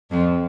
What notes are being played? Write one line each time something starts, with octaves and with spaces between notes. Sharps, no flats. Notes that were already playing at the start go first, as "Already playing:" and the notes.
F2 F3